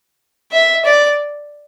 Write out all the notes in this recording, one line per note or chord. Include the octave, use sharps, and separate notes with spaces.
E5
D5